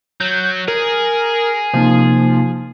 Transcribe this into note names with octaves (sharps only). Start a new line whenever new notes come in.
F#3 G6
G#4 A#4
C3 F3 A#3 D#4